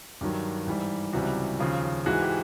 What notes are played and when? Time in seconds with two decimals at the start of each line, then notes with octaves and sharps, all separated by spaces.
0.21 G2 D#3 F#3 G4
0.67 G#2 E3 G3
1.13 C#2 C3 E3 G3 F#4
1.60 D#2 C#3 F3
2.06 G#2 E3 G#3 F#4
2.22 G4